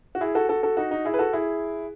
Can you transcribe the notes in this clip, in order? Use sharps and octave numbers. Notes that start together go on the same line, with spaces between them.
F#4
E4 G#4
F#4 A4
F#4 A4
F#4 A4
D#4 F#4
D#4 F#4
E4 G#4
B4
F#4 A4
E4 G#4